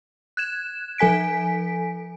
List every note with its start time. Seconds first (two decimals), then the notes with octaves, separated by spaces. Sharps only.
0.37 F#6 G#6 E7
0.98 F3 A4 G#5 B6 D7